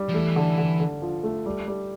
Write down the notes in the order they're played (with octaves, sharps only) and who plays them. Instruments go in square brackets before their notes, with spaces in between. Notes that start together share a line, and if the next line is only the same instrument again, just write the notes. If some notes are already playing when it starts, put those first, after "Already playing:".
Already playing: [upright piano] G3
[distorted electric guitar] F3
[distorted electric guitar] E3 [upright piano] A3
[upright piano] D3
D3
D3
F3
A3
G3
G3